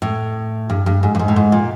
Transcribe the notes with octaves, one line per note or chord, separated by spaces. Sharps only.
A2
G2
G2
G#2
G2
G#2
A2
G#2
A#2